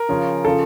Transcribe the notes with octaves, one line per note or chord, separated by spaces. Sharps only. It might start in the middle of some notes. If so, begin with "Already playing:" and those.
Already playing: A#4
C#3 F3 C#4
C#3 F3 A4